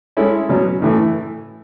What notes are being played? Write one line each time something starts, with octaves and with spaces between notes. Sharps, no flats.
G#3 C#4 E4 A4
B2 F#3 C#4
A2 E3 A3